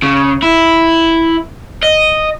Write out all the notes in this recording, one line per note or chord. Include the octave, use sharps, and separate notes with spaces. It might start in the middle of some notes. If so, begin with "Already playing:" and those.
C#3
E4
D#5